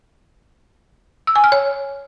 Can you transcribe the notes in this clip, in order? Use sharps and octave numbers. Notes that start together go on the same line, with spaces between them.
E6
G#5
F6
C#5